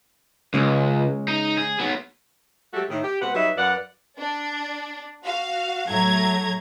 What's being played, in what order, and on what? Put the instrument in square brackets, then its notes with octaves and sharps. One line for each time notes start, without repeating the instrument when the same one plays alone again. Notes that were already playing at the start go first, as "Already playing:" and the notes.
[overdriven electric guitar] C#2 [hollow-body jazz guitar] C#3 G#3
[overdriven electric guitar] D#4
G#4
F#3 B3
[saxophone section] F#3 G#3 A3 F#4 G4 A4
A2 D#3
G4
B2 G#3 C4 B4 F#5
F#3 G3 D#4 B4 D#5 E5
F#2 B4 D5 F5 F#5
[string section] D4
F#4 F5
A2 F#3 A3 A#5 G#6